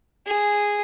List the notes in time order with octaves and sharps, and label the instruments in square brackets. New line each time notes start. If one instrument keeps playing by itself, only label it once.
[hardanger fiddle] G#4